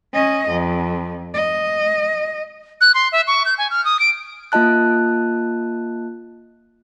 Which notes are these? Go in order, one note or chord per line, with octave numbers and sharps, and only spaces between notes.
C#4 D#5
F2
D#5
F#6
C6
E5
C#6
G6
G#5
F6
D#6
D7
A#3 F4 D#5 A5 F#6